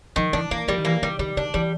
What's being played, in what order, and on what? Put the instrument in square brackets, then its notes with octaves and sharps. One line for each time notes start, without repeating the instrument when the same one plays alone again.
[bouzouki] D#3 [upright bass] F3
[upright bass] E3 [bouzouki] D4
[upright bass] E3 [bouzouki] A#3
[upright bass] F3 [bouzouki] G3
[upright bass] D#3
[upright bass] E3 [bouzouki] A#3
[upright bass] D#3 [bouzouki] G3
[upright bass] D#3 [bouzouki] G3
[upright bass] D#3 [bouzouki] D4
[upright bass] E3 [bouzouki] G3